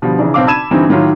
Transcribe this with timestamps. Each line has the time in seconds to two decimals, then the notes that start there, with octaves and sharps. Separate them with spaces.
0.02 B2 D3 F3 G3
0.18 C#3 E3 D4 D#4
0.34 B1 C4 F5 D6
0.47 A5 B5 E6 G#6 D#7 E7
0.71 G2 D3 E3 G3 C4 D#4
0.89 A2 D#3 F#3 F4